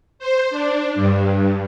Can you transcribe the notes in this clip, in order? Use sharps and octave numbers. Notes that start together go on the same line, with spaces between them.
C5
D4
G2